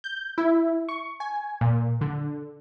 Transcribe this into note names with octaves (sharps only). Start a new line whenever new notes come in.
G6
E4
C#6
G#5
A#2
D3